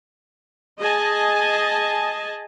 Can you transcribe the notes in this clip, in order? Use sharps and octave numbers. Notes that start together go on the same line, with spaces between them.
G#4 D#5 G#5 A5